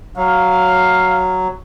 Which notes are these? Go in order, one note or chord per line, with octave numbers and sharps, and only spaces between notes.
F#3 F5